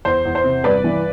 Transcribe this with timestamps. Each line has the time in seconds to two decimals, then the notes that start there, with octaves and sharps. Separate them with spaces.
0.05 E2 C5
0.25 E2
0.35 C5
0.44 C3
0.64 G2 B4 D5
0.84 E3